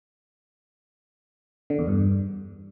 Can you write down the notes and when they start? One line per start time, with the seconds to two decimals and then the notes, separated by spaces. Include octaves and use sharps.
1.70 D3
1.79 E2
1.87 G2